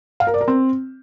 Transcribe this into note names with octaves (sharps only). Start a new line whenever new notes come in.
F5
A#4
D5
A#4
C4